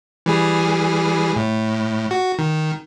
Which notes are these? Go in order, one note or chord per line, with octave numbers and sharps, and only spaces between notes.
E3 G3 G#4
A2
F#4
D#3